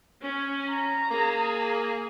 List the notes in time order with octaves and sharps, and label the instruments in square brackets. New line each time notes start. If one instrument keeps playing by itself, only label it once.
[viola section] C#4
[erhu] A#5
[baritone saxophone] A#3 [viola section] G#4